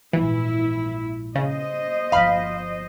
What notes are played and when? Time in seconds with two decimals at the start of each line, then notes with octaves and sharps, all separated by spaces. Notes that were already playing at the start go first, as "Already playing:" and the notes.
0.13 A#1 G#2 E3 E4
1.35 C#3 C5 D#5
2.12 G1 F3 F5 B5